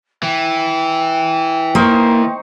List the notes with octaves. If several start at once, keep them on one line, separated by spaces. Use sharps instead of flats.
E3 G5
A#3 D#4 C5 C#6